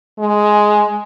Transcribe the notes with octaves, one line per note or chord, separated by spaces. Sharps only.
G#3